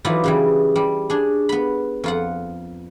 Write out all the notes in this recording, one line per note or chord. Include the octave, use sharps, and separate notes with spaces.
E3 F#3 D#4 F4 B4 D5
C#3 E3 G3
G3
D4 G#4
B3 B5
F2 F4 F#5